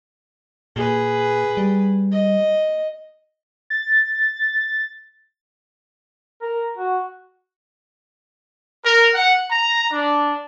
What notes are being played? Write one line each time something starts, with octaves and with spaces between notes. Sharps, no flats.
A#2 G#4 B4
G3
D#5
A6
A#4
F#4
A#4
F#5
A#5
D4